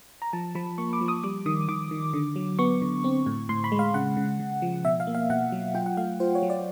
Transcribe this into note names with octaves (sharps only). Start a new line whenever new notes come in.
A#5
F3 A5
F3 B5
A#3 C#6
D6
F3
D#6
G3 D6
D#3 D#6
D#3 D6
D#3
D3
F#3
B3 C#6
D3
C4
A2
A2 C6
B5
G#3
F5
C#3 F#5
C#3
C#3
F3
B2 E5
F5
A#3
F5
B2 F#5
F#3
F4 G5
F#5
A3 F5
F4 C5
C#5
F#3
D5